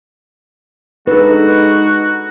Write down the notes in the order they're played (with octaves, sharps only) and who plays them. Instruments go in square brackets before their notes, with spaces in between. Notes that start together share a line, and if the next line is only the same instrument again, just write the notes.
[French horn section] G#3 D#4 [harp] D4 A4 [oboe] F#4 [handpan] B4